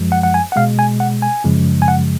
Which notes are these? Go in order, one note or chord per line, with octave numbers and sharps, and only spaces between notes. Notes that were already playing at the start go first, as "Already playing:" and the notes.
Already playing: F#2 F3 G#3
F#5
F#5
G#5
F#5
B2 G#3 F5
G#5
F#5
G#5
F#2 C#3 F3 G#3
G#5
F#5